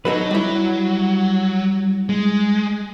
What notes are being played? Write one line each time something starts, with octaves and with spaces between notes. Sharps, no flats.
F#3 D#4 A4 B4
G3 E4
G#3